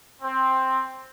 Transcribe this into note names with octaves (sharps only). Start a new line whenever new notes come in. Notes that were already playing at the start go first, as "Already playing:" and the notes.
C4